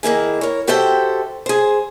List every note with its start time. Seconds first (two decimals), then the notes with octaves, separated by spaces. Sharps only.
0.03 D#3 A#3 E4 G#4
0.41 A#4 C#5
0.67 F#4 G4 A4 C5 E5 G5
1.46 G#4 C5